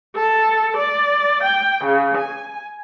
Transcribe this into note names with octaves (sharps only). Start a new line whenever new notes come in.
A4
D5
G5
C#3
G#5